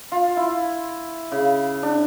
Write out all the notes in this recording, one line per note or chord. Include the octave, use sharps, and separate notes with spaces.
F4
E4
C#3
D4